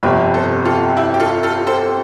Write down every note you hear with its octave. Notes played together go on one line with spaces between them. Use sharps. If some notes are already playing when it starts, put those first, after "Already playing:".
G1 F2 C3 G4 B4
A4 C5
F4 A4
E4 G4
G4
F4 A4
F4 A4
A4 C5